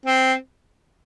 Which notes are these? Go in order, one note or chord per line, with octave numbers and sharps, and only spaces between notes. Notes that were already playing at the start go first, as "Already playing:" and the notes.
C4